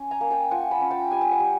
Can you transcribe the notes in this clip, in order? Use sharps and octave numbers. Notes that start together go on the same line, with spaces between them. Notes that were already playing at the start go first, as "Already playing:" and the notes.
Already playing: C#4
G#5 A#5
A#3
G5 A5
F4 F#5 G#5
A5 B5
C#4
G5 A5
G3 G#5
A5
F#5 G#5
G3